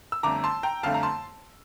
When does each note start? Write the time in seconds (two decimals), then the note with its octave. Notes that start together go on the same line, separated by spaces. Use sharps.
0.12 E6
0.23 G1 F2 D3 A3 A#5 D6
0.44 A5 C6
0.63 G5 A#5
0.83 G1 F2 D3 A3 F5 A5
0.94 A#5
1.03 A5 C6